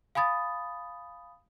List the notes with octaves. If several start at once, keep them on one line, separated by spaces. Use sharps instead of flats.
F5 G#5 B5 D#6 A6